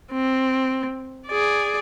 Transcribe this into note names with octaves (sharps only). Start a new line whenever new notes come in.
C4
G#4 D5